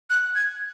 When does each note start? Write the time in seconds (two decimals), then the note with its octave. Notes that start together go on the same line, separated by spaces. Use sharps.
0.10 F#6
0.35 G#6